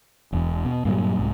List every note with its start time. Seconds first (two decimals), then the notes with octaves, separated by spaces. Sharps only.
0.32 E1 E2
0.65 B2
0.85 G2 A#2 E3 F#3
1.19 C2 G#2